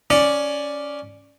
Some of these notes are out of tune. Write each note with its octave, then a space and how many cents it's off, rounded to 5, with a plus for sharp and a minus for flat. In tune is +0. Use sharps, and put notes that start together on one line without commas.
C#4 +10 D5 +0